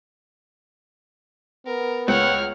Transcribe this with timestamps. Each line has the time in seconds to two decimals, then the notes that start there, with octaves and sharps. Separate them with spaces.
1.66 B3 A#4
2.08 C#2 C#5 F#5 F6